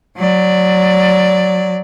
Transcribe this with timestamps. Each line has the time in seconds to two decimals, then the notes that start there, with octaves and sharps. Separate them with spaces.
0.17 F#3 D5